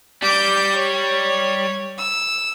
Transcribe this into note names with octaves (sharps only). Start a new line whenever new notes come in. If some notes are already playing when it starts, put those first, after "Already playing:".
G3 D6 G6
C#5
E6